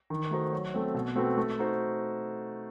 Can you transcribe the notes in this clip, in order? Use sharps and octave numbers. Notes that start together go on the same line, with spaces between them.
D#3
A3 D#4 F#4 C5
F#3
A3 C4
B2
A3 C4 F#4 B4
A3
D#4 F#4 C5